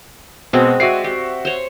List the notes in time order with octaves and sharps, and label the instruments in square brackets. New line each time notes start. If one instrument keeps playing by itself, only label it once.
[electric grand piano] B2 [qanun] G#3 C4 F#4
[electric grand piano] F#4 E5 C7 [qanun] D5 G#5 D6
[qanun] G4
C5 C#5